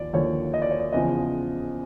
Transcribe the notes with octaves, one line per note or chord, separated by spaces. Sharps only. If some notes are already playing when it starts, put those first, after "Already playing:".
Already playing: D#2 F3 D5
D#2 D3 F3 C#5
D#5
D5
C#5
D5
E2 C#3 F3 D#5